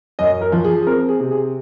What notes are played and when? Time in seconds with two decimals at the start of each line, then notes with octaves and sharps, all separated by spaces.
0.19 F#2 D#5
0.41 A#4
0.52 F3
0.64 G#4
0.82 G#4
0.86 C4 A#4
1.09 G#4
1.19 C3
1.31 G#4